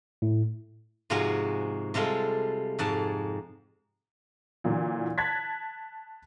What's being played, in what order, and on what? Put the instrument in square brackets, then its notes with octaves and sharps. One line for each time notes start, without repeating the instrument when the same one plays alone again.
[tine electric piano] A2
[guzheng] G#2 C3 F3 G#3 F4 F#4
C3 G3 G#3 F4 A4
F2 G#2 A5
[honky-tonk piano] A#2 D3 E3 F#3
A5 F#6 G#6 A6 B6